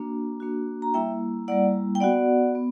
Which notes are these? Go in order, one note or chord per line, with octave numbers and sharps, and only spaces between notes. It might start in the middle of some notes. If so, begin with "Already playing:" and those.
Already playing: A#3 D4 F#4
A#3 D4 F#4
A#5
G3 A#3 E4 E5 G5
G3 A#3 E4 D5 F#5
G5
B3 F#4 D5 F#5
B3